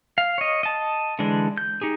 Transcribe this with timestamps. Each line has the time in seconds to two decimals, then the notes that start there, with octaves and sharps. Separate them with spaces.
0.18 F5
0.38 C#5 D#5
0.63 D#5 A5
1.19 D3 E3 G#3 D4
1.58 G6
1.81 D#4 G4 G#4